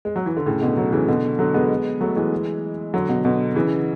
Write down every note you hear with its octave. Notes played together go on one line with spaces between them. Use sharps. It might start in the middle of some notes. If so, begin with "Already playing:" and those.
G#3
F#3
E3
D3
A2 C#3
B2 D3
D3 F#3
C#3 E3
B2 D3
D3 F#3
G#3 B3
F#3 A3
E3 G#3
D3 F#3
B2 D3
B2 D3
C#3 E3